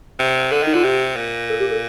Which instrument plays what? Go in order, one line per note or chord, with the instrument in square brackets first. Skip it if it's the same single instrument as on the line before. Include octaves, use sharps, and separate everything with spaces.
[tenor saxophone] C3
[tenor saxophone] D3 [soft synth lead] A4
[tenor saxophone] D#3 [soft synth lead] D#4
[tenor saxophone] D3 [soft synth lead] F4
[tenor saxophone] C3 [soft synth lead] G4
[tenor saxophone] A#2
[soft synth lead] A4
G4
A4